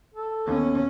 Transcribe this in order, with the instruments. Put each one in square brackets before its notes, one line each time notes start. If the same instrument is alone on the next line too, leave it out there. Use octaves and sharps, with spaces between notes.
[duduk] A4
[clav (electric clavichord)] D#2 [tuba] B3 [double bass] C#4